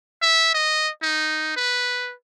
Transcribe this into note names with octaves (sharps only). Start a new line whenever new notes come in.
E5
D#5
D#4
B4